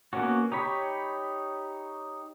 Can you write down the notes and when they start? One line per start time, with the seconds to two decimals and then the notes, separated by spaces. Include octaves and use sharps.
0.13 A#3 B3 C#4 F#4
0.52 D#4 G4 C#5 B5